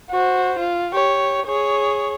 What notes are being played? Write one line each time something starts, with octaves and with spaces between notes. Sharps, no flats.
F#4 C5
F4
G4 C#5
G#4 C#5